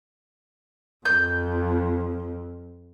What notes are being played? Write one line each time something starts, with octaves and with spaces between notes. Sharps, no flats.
F2 G6